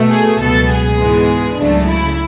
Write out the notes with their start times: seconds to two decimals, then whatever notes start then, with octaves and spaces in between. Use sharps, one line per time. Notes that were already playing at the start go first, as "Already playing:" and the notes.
Already playing: B2 A3
0.10 G#4
0.39 C#2 B2 F#3 B3 A4
0.70 G#4
0.98 G#2 E3 G#3 B3
1.58 C#2 C#3 F#3 A3 D4
1.88 E4